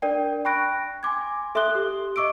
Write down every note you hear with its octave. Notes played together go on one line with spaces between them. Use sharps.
D4 A#4 D5 G5
G5 B5 C#6 F#6 A#6 D7
G#5 C6 D6 G#6
A4 E5 C6 D#6 F#6 G7
G4
D#5 C#6 D6 E6 D7